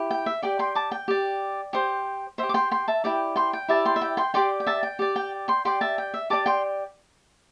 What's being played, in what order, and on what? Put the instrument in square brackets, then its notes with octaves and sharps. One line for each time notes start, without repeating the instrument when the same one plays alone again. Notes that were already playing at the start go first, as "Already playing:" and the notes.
Already playing: [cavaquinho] E4 G4
G5
E5
G4 D5 G5
G5 C6
A5 D6
G5
G4 D5
G4 C5
C5 E5
G4
D6
G5 C6
G5 C6
E5 A5
E4 G4 D5 G5
G5 C6
G5
E4 G4 D5 E5 A5
G5 C6
E5
G5
G5 C6
G4 D5 G5 C6
G5
E5 A5
G5
G4 D5
G5
G5 C6
G4 D5 G5 C6
E5 A5
G5
E5
G4 D5 A5 D6
G5 C6